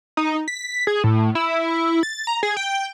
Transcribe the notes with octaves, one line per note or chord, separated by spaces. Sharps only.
D#4
B6
G#4
A2
E4
A6
A#5
G#4
G5